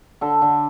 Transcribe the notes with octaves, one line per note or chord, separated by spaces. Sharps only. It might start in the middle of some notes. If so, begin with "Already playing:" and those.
D3 A4
D3